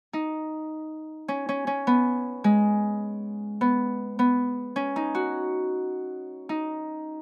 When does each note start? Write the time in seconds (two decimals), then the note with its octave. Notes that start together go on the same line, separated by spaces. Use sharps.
0.13 D#4
1.28 C#4
1.49 C#4
1.67 C#4
1.87 B3
2.44 G#3
3.61 B3
4.19 B3
4.76 C#4
4.96 D#4
5.15 F#4
6.49 D#4